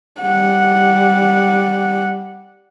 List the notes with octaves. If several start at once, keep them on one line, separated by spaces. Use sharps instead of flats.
G3 F#5